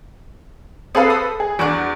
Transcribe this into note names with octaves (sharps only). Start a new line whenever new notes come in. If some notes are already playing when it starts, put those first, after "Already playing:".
C4 G#4 A4 B4 F5
D#6
G#4
E2 D4 F#4 D5 F#6